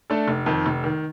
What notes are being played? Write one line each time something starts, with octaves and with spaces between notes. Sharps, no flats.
A3 D4 A4
F1
F2 D#3
F1
D#3